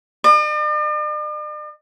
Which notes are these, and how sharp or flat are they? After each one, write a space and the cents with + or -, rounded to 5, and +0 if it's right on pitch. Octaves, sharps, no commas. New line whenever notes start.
D5 +45